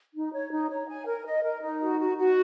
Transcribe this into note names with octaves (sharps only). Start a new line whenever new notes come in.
D#4
C#5
D#4
C#5
G#5
A#4
D#5
A#4
D#4
F#4
F#4
F#4